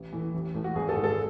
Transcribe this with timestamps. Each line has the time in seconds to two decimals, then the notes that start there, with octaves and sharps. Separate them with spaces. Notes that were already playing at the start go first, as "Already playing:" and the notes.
Already playing: A1
0.12 A2 E3 A3
0.34 A1
0.54 A2 E3 A3
0.64 F#4
0.75 G#1 G#4
0.89 A4
0.96 G#2 G#3
1.04 A4